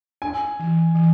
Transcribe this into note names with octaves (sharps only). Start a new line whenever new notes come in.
D4 G#5
E3
E3